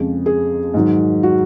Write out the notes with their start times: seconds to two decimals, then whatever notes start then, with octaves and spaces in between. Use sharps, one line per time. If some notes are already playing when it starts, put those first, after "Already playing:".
Already playing: F2 C#3 F3 G#3
0.26 G#4
0.74 G#2 D#3 F#3
1.23 F#4